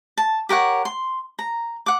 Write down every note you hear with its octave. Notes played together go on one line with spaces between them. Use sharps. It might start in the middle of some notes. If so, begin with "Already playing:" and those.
A5
G4 A#4 C#5 F#5
C6
A#5
F#5 D6